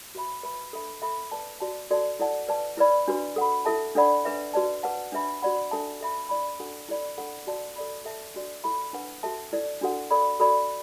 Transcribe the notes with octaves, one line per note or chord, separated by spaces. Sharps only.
F#4 B4 E5 B5
B4 E5 B5
D4 A4 E5 B5
A4 E5 B5
B4 D5 A5
F#4 D5 A5
F#4 A4 D5 A5
E4 A4 D5 F#5 A5
B4 D5 A5
E4 B4 D5 B5
D4 F#4 B4
A4 F#5 B5
E4 A4 E5 A5
D4 A4 D5 F#5 B5
D4 B4 E5
F#4 B4 D5 A5
B4 F#5 A5
D4 B4 E5 B5
F#4 D5 F#5 B5
D4 A4 E5 A5
A4 E5 B5
E4 D5 B5
D4 F#4 A4 F#5
E4 A4 D5 B5
D4 A4 F#5 B5
F#4 D5 A5
A4 D5 B5
A4 E5 A5
D4 F#4 D5
E4 A4 E5 B5
D4 B4 F#5
F#4 A4 E5 A5
E4 A4 D5
D4 F#4 A4 F#5
A4 D5 B5
F#4 A4 D5 B5